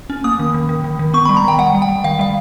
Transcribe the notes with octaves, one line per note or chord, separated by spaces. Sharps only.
C#4
A#3 D#6
D#3
D#3
D#3
D#3
D#3
B3 C#6
B5
G3
A#5
D#3 G5
G3 F#5
G3
G5
G3
D#3 F5
G3 F5